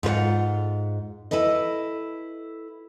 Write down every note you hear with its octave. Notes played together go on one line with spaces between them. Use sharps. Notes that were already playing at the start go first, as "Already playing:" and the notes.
G#2 F4 B4 F#5
E4 A4 B4 D#5